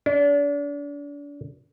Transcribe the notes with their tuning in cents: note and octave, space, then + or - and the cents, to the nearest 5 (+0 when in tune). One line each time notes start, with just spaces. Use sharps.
D4 -35